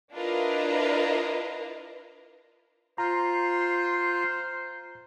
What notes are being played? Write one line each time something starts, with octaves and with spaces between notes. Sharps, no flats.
D4 E4 F4 A#4 B4 D#5
F4 C5 A#5